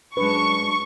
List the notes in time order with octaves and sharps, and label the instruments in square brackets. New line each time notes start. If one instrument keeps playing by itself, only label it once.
[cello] F#2 G#3 [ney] D4 [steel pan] B4 [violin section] C#6